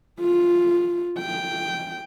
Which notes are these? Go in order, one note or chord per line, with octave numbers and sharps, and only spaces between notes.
F4
G5